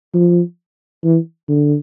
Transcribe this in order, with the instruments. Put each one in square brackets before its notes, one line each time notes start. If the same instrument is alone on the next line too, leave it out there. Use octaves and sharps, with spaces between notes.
[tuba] F3
E3
D3